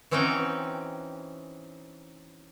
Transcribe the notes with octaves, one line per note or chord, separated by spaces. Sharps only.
E3 C4 C#4 D#4 F#4 G5